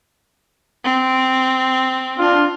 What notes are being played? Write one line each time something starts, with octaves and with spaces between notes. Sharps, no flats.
C4
D4 F4